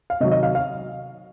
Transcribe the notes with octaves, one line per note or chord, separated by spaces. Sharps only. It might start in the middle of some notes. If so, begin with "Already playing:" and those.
F5
C3 D#3 F#3 D#5
D#5
F5
F5